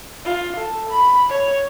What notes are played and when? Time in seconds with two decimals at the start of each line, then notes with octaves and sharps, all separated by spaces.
0.25 F4
0.57 A4
0.90 B5
1.29 C#5